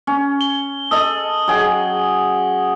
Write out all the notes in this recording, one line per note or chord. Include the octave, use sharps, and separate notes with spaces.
C#4
G7
A4 D#5 D#6
F#3 G#4 G5